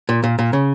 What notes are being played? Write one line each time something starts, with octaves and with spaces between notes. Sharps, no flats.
A#2
A#2
A#2
C#3